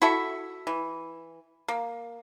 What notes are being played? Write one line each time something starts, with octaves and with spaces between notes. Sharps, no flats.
E4 F#4 A4 E5
E3
A#3